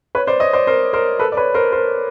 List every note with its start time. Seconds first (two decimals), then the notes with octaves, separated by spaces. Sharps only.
0.15 B4 C#5
0.27 C5 D5
0.40 C#5 D#5
0.53 C5 D5
0.67 A#4 C5
0.93 A#4 C5
1.19 A4 B4
1.32 D5
1.37 B4 C#5
1.54 A#4 C5
1.72 A#4 C5